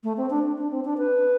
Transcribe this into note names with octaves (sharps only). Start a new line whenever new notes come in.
A3
C4
D4
D4
C4
D4
B4